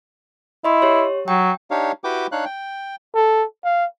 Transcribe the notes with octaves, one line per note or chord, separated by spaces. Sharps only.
E4 D#5 C6
G4 C#5
F#3 G5
D4 D#4 G4 C#5 F5
E4 F#4 G4 B4 G5 D6
D4 D#4 C#5 F5 F#6
G5
A4
F5